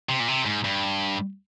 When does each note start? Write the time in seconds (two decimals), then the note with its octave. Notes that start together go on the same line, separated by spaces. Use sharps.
0.09 C3
0.20 A#2
0.28 C3
0.46 G#2
0.65 G2